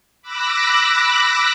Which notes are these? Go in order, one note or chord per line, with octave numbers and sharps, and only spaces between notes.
B5 D6 E6 F#6 A#6